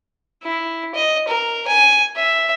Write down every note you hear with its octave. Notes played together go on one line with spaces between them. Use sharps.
E4
D#5
A#4
G#5
E5